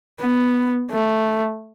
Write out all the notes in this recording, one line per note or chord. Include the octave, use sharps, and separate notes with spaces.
B3
A3